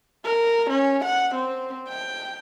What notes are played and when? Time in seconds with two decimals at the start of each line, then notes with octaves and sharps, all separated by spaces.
0.25 A#4
0.70 C#4
1.05 F#5
1.35 C4
1.88 G5